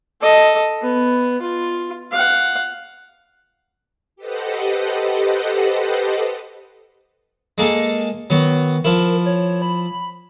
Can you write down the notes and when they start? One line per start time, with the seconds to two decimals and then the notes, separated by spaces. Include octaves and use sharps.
0.21 A4 D#5
0.82 B3
1.41 F4
2.12 F5 F#5
4.16 G4 A4 B4 C5 D#5 F#5
7.58 G#3 A#3 A4
8.30 D#3 F#3 B3
8.85 F3 E4 A#4
9.26 C#5
9.62 B5